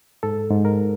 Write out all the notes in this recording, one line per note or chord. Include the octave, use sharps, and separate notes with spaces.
G#2 A4
G#2
A#4